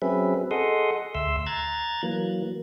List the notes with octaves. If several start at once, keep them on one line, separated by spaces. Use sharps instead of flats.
F#3 C4 C#4 G#4 B4 E5
G#4 A4 D#5 F#5 C6 D#6
D2 E5 C6 E6
A#5 F#6 G#6 A6
E3 F#3 A#3